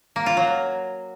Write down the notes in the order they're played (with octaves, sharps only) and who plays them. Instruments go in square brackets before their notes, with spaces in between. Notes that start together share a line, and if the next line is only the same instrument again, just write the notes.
[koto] A#3
F4
F#3